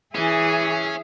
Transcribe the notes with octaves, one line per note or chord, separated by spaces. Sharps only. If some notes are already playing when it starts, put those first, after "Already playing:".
E3 C#4 G#4 E5